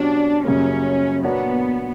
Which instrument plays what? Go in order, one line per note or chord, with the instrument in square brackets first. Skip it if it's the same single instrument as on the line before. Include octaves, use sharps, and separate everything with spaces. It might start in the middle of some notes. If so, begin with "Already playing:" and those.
Already playing: [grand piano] B2 F#3 C#4 G4 C#5 [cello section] D4
[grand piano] F#2 C#3 G3 A#3 [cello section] C#4
[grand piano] A#2 A#3 D4 F#4 C#5 [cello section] B3